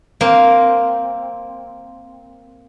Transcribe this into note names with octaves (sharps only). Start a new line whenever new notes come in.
A#3 C4